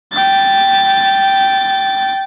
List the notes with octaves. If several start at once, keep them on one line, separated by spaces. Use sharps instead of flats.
G5 A6